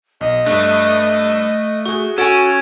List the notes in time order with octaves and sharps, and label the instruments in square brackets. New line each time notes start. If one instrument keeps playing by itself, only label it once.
[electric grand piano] B1 [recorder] D#5
[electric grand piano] G2 D4 [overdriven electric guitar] A3 [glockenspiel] F#6
[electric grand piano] F#4 G#4 [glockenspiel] C#6
[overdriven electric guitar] C#4 [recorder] F#4 [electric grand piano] A4 F#5 A6 [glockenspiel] G#5 D7 E7